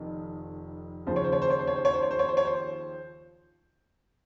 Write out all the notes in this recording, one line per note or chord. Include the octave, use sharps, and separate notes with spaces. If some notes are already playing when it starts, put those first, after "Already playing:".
Already playing: F1 F2 D#3
D#2 C#3 F3 C5
C#5
C5
C#5
C5
C#5
C5
C#5
C5
C#5
C5
C#5
C5
C#5
C5
C#5
C5